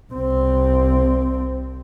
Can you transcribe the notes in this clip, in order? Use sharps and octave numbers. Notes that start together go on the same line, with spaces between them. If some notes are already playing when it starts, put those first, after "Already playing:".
C2 C4